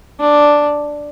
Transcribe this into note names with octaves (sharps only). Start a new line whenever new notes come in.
D4